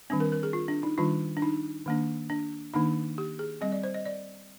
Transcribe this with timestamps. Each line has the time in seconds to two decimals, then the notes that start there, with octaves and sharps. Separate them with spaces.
0.10 D#3 G3 C4 D4
0.20 A#4
0.32 A#4
0.43 G#4
0.53 F4
0.68 D4
0.83 D#4
0.98 D#3 G3 D4 F4
1.37 D4
1.42 D#4
1.86 D#3 A#3 D4
2.30 D4
2.74 D#3 A#3 D4 D#4
3.18 G4
3.39 G#4
3.61 G3 C4 D#5
3.72 D5
3.84 C5
3.94 D#5
4.05 D5